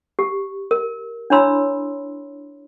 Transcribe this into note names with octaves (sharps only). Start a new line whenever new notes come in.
G4
A#4
D4 E4 C#5 B5 C6 E6